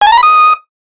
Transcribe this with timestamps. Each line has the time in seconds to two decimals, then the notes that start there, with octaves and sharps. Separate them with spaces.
0.01 G#5
0.07 A5
0.12 A#5
0.17 B5
0.23 D#6